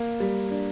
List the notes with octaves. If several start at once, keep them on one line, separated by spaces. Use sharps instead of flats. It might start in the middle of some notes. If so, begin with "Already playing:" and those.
Already playing: A#3
G3
D4